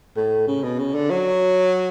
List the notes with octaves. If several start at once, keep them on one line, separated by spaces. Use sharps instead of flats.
A2
C#3
B2
C#3
D3
F#3